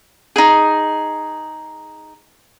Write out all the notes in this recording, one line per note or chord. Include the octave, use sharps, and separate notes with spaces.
D#4 G#4